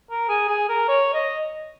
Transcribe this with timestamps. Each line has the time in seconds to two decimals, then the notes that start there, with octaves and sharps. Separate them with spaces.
0.10 A#4
0.29 G#4
0.48 G#4
0.69 A#4
0.88 C#5
1.13 D#5